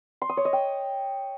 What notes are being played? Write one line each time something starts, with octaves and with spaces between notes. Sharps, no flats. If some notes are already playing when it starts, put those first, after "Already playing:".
C6
D#6
C#5
D#5
G5